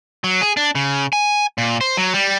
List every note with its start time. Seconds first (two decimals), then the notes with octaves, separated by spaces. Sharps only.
0.24 F#3
0.41 G#4
0.57 D4
0.75 C#3
1.13 G#5
1.58 A#2
1.81 C5
1.97 F#3
2.14 G3